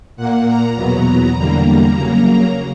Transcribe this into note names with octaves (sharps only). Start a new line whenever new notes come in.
A#2 A#3 F#5
A#5
E2 B2 F#3 B3 A#5
E2 D3 G3 A#3 A#5
A#5
C#3 F#3 A#3